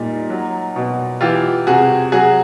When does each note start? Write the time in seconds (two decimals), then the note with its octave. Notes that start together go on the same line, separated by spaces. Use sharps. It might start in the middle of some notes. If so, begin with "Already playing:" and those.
Already playing: A#2 G3 D#4
0.30 F#3
0.76 B2
1.21 E3 F4 G4
1.67 C3 F#4 G#4
2.12 F#3 F#4 G#4